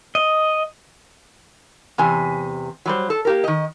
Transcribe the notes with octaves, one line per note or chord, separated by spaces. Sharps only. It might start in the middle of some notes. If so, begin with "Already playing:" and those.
D#5
E2 C3 G#5
F#3 G3 C5
A4
A#3 G4 A#4
D#3 D#5